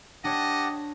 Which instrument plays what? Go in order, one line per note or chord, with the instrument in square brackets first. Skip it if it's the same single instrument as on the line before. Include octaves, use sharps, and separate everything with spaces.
[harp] D4 C#5 [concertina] G4 F#5 A5 [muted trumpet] D#5